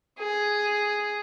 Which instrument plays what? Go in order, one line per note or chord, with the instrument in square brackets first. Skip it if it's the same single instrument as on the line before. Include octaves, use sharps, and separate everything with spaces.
[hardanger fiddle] G#4